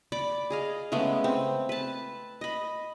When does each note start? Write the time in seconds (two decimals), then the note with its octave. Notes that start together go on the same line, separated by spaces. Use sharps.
0.12 D5 B5 D6
0.50 G#4 D#5 F5
0.92 C#3 G#3 A3 B3
1.24 C4
1.69 B4 A5
2.41 D#5 B5